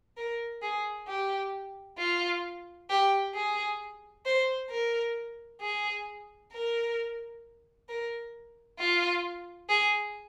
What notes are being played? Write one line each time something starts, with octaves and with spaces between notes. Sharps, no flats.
A#4
G#4
G4
F4
G4
G#4
C5
A#4
G#4
A#4
A#4
F4
G#4